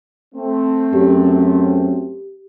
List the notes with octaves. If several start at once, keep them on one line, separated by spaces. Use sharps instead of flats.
A3 C4
F#2 G4